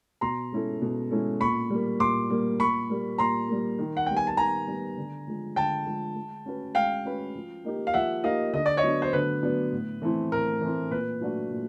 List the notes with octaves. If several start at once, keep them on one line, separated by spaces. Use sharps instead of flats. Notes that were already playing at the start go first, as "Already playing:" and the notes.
B2 A#5 C6
G#3 C#4 E4 A4
B2
G#3 C#4 E4 A4
A#2 B5 C#6
G3 A#3
A#2 C6 D6
G3 A#3
A#2 B5 C#6
G3 A#3
A#2 A#5 C6
G3 A#3
D#3
F#5
G3 B3 G5
G#5
A5
D#3 G#5 A#5
G3 B3
D3
F3 G#3
D3 G5 A5
F3 G#3
G#3
C#4 F#4 B4
G#3 F5 G5
C#4 F#4 B4
F3
A#3 D#4 G4
F5
F3 E5 F#5
A#3 D#4 G4 D#5 F5
D3 D#5
D5
C#5 D#5
F#3 B3 D4
C5
D3 B4
F#3 B3 D4
A2
E3 A3 C4 E4
A2 A#4
E3 A3 C4 E4
A#2 B4
F#3 A3 D4 F#4
A#2